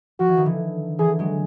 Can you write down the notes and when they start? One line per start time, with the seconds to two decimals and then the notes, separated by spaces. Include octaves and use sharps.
0.20 F3 F#4
0.29 E3
0.37 D#3
0.45 D3 E3
0.99 D3 E3 G#4
1.19 F#3 G#3